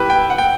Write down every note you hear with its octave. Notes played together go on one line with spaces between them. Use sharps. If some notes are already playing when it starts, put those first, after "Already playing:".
Already playing: E4 G4 B4
G5
F#5
G5